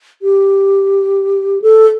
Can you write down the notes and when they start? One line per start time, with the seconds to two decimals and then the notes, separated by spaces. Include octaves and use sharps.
0.22 G4
1.62 A4